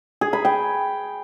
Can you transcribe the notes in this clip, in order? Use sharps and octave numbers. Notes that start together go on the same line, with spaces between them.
G#4
B5
G5